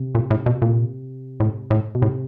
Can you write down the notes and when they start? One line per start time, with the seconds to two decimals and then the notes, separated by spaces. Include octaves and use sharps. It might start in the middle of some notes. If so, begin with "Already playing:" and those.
Already playing: C3
0.15 A#2
0.30 A2
0.46 B2
0.62 A#2
1.40 A2
1.70 A2
1.95 B2
2.01 A2 C3